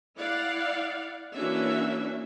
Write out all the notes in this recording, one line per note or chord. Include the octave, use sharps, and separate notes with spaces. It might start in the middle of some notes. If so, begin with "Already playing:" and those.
E4 D5 F5 F#5
E3 A#3 C#4 D4 F#4 E5